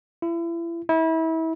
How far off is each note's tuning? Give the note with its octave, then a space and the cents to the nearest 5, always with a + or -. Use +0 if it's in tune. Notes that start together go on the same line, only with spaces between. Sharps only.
E4 +35
E4 -30